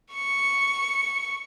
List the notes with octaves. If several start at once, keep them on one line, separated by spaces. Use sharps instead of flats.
C#6 C#7